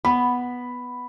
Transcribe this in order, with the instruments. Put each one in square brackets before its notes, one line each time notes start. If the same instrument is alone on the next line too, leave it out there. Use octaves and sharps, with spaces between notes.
[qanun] B3 [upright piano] B5